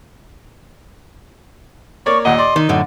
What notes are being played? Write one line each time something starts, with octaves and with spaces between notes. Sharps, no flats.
A#3 C#5 D5 C#6
D#2 A#2 D#5 F#5
D5 C6
D#3 D#4
F#2 A2 D3 F#5